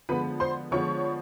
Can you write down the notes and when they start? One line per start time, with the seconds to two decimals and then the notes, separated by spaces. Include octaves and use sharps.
0.09 D3 F3 G#3 B3 B4 B5
0.40 C5 C6
0.71 D3 F3 G#3 B3 C#5 C#6